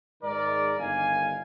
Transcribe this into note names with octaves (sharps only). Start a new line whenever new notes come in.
G#2 D#3 G#3 A#4 D5
G1 G2 D#3 F5 G#5